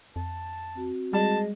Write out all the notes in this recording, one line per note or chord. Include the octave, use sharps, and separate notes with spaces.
F2 A5
C4 F#4
G3 G#3 A5